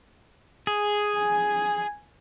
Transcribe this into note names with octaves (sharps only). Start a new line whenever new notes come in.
G#4
G#5